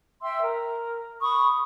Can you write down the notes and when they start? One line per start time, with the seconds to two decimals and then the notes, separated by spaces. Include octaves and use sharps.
0.22 E5 G5 C6 E6
0.41 A#4
1.20 B5 C#6 D#6